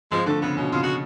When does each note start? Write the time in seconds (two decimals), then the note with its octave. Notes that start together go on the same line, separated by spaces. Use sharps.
0.11 F3 G#3
0.26 D3 A3
0.42 C#3 B3
0.57 B2 C#4
0.72 C#3 F4
0.83 F#4